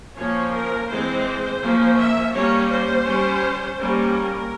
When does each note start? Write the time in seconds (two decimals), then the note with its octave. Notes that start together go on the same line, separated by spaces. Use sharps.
0.16 F3 A#3 C#4 C#5
0.52 A#4
0.88 E3 G#3 C4 C5
1.61 F3 A#3 C#4
1.97 E5
2.33 G3 A#3 C#4 C#5
2.70 C5
3.05 G3 C#4
3.77 G3 A#3 C#4 A#4